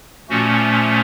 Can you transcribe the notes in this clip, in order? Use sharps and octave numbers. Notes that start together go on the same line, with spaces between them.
A#2 F3 A3 C#4 F#4